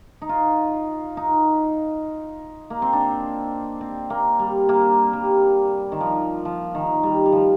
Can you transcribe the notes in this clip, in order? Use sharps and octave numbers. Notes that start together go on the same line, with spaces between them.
D#4
F4
D#4
A#3
C4
D4
C4
A#3
G3
A#3
G3
D#3
F3
F3
D#3
G3
G3
F3